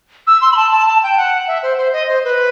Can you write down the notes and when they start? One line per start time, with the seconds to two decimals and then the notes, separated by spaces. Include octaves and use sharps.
0.27 E6
0.41 C6
0.52 B5
0.57 A5
0.72 A5
0.87 A5
1.03 G5
1.17 F#5
1.47 E5
1.63 C5
1.78 C5
1.93 D#5
2.09 C5
2.24 B4